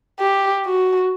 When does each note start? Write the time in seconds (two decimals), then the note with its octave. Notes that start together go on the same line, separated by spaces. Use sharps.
0.20 G4
0.65 F#4